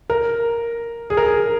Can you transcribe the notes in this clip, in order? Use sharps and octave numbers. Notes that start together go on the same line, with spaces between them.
A#4
G#4
A#4
G#4